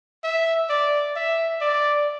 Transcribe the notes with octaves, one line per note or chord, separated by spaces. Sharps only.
E5
D5
E5
D5